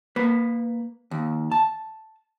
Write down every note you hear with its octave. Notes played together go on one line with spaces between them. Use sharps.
A#3 B4
D#2
A5